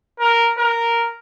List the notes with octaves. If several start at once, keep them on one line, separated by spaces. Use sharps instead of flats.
A#4
A#4